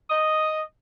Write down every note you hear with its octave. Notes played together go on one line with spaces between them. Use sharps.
D#5